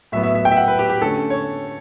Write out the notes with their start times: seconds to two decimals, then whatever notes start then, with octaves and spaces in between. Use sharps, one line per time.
0.12 A2 F#3 B3 E5
0.23 E5
0.35 E5
0.45 G5
0.51 E5
0.57 F#5
0.68 B4
0.79 G4
0.90 G4
1.01 D3 A3 C#4 A4
1.30 C#5